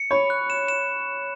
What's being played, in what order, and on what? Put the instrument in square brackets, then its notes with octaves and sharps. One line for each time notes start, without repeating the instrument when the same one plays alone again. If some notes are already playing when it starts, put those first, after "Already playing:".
Already playing: [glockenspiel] C#7
[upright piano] C#5 [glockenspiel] B5
[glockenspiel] F#6
E7
E7